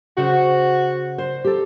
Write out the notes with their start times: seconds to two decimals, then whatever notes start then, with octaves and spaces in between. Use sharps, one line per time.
0.18 C#3 F#4 C5 F#5
1.18 C5
1.45 G4 A4